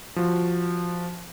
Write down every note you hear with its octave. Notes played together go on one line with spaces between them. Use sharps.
F3 F#4